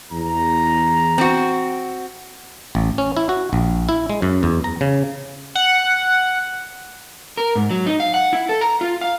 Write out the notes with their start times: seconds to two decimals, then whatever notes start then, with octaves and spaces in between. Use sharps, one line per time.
0.12 E2 A#5
1.18 C4 F#4
2.75 A1
2.98 C#4
3.17 E4
3.29 F#4
3.53 A#1
3.89 E4
4.10 G#3
4.22 F#2
4.43 E2
4.64 A#5
4.81 C#3
5.55 F#5
7.37 A#4
7.55 G#2
7.71 F#3
7.86 D#4
8.00 F5
8.14 F#5
8.33 E4
8.49 A4
8.61 A#5
8.81 F4
9.01 F5